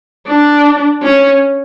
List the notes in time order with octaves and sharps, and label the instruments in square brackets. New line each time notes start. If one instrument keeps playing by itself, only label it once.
[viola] D4
C#4